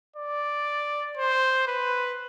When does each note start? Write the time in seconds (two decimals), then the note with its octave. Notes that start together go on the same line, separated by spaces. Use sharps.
0.16 D5
1.17 C5
1.67 B4